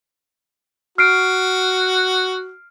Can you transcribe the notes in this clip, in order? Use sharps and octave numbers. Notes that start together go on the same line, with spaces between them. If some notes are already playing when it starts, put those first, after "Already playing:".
F#4 F6 C7 D7